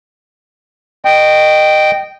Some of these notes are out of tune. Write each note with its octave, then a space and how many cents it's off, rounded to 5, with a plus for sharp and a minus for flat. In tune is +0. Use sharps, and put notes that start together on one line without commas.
D#5 -20 G5 -10